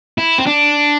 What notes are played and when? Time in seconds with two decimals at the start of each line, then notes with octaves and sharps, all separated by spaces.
0.18 E4
0.38 C4
0.46 D4